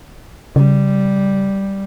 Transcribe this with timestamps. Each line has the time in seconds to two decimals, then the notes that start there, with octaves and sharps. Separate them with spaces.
0.56 C#3 G3